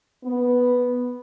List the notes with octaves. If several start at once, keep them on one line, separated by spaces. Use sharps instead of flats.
B3